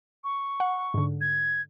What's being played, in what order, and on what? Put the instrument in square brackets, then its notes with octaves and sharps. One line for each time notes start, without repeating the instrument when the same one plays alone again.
[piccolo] C#6
[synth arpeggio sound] F#5
G#2 D3
[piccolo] G#6